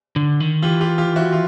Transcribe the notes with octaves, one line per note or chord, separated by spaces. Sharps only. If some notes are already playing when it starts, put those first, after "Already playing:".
D3
D#3
E3 F4 G4
F4 G4
F4 G4
E4 F#4
F4